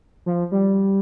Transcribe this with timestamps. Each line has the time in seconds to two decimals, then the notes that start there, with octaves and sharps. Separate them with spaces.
0.26 F3
0.52 G3